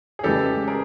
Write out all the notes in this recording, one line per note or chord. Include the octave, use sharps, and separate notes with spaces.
G#4
C#3 E3 G#3 G4 A4
G#4 A#4